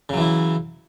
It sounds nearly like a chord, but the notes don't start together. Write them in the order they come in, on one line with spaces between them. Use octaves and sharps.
C#3 F#3 E3 E4